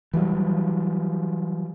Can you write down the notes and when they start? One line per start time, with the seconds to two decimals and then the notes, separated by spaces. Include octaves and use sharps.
0.14 E3 F#3 G3